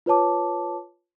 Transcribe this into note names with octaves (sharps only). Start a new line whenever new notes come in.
F4 B4 C#5 A5 D6